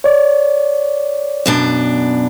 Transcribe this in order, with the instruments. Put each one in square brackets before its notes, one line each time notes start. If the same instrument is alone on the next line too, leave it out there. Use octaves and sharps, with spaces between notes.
[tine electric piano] C#5 D5
[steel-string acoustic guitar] F#2 B2 D4